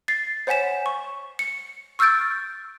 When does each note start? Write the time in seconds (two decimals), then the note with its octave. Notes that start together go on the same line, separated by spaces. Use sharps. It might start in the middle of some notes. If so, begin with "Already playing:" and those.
0.08 A6 C7
0.47 C5 C#5 F#5 G#5 B6 E7
0.86 C#6
1.39 C#7
1.99 C#6 E6 F6 G6 A6 D7